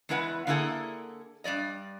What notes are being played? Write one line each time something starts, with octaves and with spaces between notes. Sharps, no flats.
E2 G#3 E4 B4 F#5
D3 A#3 E4 G#4 A4
G2 A3 D5 D#5